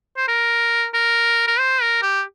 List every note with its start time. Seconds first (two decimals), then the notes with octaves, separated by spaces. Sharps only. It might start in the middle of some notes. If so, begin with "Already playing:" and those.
0.17 C5
0.28 A#4
0.94 A#4
1.48 A#4
1.59 C5
1.82 A#4
2.02 G4